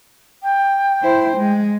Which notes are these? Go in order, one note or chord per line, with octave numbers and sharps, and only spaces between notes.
G5
E4 C5
G#3